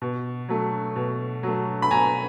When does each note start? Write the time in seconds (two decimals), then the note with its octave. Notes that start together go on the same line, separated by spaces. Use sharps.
0.02 B2
0.49 F#3 A3
0.96 B2
1.43 F#3 A3
1.82 B5
1.90 B2 G#5 A#5